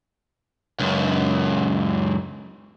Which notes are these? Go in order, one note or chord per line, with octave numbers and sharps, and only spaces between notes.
C#2 F#2